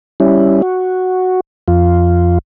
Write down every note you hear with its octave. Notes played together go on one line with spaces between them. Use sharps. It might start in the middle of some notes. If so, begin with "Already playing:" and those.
G3 C#4 E4
F#4
F2 F4